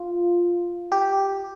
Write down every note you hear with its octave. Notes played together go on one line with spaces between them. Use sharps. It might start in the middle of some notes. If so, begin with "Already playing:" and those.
Already playing: F4
G4